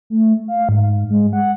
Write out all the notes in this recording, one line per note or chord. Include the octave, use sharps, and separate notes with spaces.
A3
F5
G#2
G#3
F#5